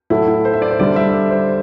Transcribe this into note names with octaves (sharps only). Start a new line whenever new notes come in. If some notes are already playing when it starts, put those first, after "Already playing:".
A2 F#3 A3 E4
E4
C5
E5
D5
C5
D3 G3 D5
E5
C5
C5